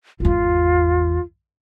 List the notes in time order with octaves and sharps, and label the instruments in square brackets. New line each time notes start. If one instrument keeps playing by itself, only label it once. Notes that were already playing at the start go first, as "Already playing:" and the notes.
[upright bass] G#1 E2 [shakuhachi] F4